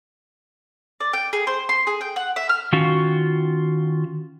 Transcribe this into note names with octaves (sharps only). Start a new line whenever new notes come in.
D5
G5
G#4
C5
C6
G#4
G5
F#5
E5
F6
D#3 C#4 F4 F#4